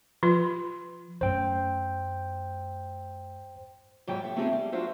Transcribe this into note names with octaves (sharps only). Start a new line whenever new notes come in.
F3 F4 C6
F#2 A3 C5 G5
G#2 F#3 G3 G5
A2 A4 E5
A3 C4 D#4 F4 G4 G#4
G3
F#3 D4 F4 F#4 C5 E5